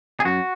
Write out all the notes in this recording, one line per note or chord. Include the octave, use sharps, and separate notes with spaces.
G#4
F#2 F#4